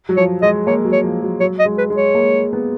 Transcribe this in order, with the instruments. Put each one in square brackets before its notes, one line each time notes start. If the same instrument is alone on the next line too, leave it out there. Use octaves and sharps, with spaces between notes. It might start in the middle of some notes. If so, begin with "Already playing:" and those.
[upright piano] F#3
[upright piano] F3 [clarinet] C#5
[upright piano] G#3 [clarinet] D#5
[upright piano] A#3 [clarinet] C#5
[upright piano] F#3
[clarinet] C#5
[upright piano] F3
F#3
[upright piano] F#3 [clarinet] C#5
[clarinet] D#5
[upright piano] G#3
[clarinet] B4
[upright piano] G#3
[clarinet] C#5
[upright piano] A#3
B3